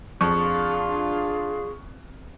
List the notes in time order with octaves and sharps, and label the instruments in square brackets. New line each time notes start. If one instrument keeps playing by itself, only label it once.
[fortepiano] F2 [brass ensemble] D4 F4 [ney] G#4 [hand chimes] C#6